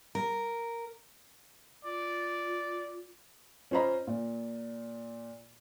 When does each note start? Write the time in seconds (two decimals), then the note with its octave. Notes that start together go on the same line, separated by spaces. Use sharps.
0.15 A#4
1.85 F4 D5
3.71 C#4 F4 C5 D#5 A#5 B5
4.07 A#2